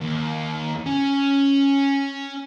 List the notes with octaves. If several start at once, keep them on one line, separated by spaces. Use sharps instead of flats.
D#2
C#4